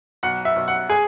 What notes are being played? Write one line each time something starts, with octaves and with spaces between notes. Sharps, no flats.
B1 F#5
E5
B1
F#5
G#4 G#5